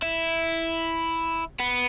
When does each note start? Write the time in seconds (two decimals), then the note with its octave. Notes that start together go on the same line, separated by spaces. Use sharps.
0.02 E4
1.60 B3